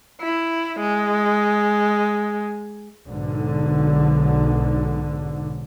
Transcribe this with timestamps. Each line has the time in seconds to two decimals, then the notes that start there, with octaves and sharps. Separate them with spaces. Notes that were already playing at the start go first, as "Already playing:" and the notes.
0.21 E4
0.80 G#3
3.05 B1 G#2 D3